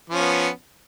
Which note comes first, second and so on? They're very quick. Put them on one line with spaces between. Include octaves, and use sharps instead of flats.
F3 C#4 B3